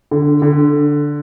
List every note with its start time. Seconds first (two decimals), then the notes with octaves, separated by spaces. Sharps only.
0.11 D3
0.42 D3